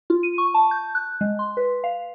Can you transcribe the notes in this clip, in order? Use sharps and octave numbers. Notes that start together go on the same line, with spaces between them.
F4
D#7
C#6
A5
G6
F#6
G#3
C6
B4
F5